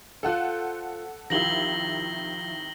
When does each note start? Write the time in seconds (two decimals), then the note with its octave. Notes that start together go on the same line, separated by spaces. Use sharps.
0.23 F4 A4 C5 F5 F#5 F#6
1.30 C3 D#3 F3 E4 A#6 F#7 G7